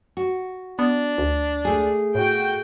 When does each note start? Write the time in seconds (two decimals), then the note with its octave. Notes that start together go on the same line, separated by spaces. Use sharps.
0.17 F#4
0.79 B3 D4
1.18 D2
1.65 A3 G#4
2.15 A2 F#4 G5